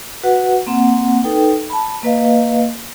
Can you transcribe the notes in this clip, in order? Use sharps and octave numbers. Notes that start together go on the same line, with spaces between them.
F#4 B4 F#5
A#3 C4 F#5
D#4 A4 B4 G5
A5 B5
A#3 B4 D#5 F5